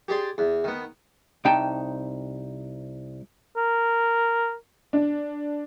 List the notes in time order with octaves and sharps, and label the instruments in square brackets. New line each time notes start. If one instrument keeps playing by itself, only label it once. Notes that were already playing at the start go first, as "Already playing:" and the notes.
[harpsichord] G4 G#4 D5 C6
E2
D#3 B3
[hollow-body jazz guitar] C2 D#4 G5 A5
[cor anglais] A#4
[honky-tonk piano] D4